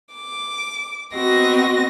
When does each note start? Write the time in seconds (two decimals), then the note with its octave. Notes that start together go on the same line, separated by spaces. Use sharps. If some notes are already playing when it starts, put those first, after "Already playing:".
0.14 D6
1.14 B3 C4 F#4 D#5 A#6